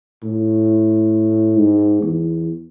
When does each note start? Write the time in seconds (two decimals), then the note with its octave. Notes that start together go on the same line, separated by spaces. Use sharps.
0.24 A2
1.59 G#2
2.02 E2